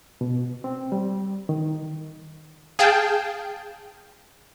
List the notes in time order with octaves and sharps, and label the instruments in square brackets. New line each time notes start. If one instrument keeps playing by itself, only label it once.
[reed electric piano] B2
C4
G3
D#3
[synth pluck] G#4 F5 G5 A5